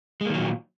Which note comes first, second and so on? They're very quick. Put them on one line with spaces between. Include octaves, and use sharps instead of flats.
G#3 A#3 D#3 F#3 A#2